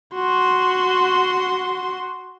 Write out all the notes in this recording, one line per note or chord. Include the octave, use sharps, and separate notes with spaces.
F#4 C6